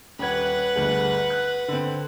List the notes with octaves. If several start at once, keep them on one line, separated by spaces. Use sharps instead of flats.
D#1 B4 F#5 G#6
G1 D2 G#4
F#6
D3 C4